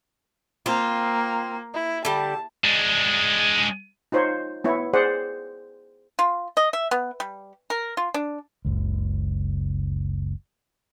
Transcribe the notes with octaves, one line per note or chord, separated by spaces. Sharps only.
A#3 C4 F4
E4
D3 G3 A5
G#3 D4
D#4 F4 C5 C#5
B3 E4 C#5
G#4 C5 D5 F#5
F4
D#5
E5
B3
G3
A#4
F4
D4
F#1 C#2